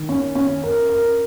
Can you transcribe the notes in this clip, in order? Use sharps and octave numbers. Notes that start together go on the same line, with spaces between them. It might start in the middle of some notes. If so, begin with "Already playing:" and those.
Already playing: D#3
C#4
C#4
A#4
A#4